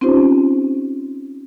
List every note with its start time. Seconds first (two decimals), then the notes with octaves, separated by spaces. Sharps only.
0.01 C4 C#4 D#4 F4 G4 C5